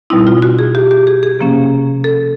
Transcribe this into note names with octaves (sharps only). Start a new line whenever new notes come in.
B2 G3 C4 D#4 E4
F4
F#4
G#4
G4
G4
G#4
G#4
C3 F3 A#3 C#4
A4